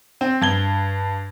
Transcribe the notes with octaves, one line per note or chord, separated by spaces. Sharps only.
C4
G2 G#6 G7